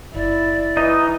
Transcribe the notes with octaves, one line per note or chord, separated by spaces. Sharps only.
F#1 E4 D5
E3 D#4 D#5